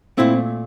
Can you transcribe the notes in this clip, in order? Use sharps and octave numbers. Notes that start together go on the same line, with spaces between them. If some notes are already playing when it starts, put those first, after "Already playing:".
A#2 A3 C4 E4